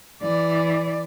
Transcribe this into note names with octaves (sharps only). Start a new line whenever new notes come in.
E3 D5